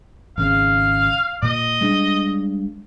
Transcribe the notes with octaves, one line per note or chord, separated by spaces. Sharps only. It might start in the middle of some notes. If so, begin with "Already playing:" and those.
G#1 C#3 F5
A#2 D#5
G3 G#3 D4